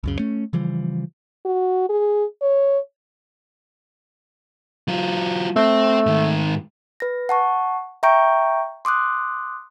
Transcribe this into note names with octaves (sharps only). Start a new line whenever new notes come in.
C#2 F#2 C#3
A3 C#4
C#3 E3 F3 G3
F#4
G#4
C#5
F#3 F4
A3 C4
G#2 D#3
B4 A#6
F#5 A5 C#6
E5 G5 A#5 C#6 G6 D7
C6 D6 D#6 F#6